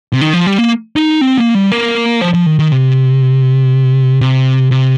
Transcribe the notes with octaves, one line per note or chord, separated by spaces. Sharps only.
C3
D#3
F3
G3
A#3
D#4
C4
A#3
G3
A#3
F3
F3
D#3
D#3
C3
C3
C3